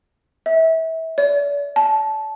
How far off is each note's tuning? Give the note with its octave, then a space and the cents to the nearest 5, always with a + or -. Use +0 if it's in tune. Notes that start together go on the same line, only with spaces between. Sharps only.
E5 -30
D5 -40
A5 -15